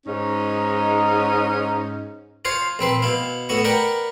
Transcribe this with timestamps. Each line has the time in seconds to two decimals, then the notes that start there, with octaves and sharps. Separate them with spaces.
0.07 G#2 C#4 D#4
2.45 F4 C5 C#5 F5
2.79 A#1 C4 B4 C6
3.02 B2 E4 F5
3.49 A2 B3 F#4 C#6
3.64 A#4 B4 D5 F#5 G5